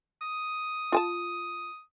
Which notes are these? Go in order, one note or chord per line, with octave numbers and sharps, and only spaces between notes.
D#6
F4 G#5 A5